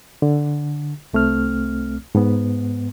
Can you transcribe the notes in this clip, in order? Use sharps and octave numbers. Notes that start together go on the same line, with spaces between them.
D3
C2 A3 C4 F6
G#2 B3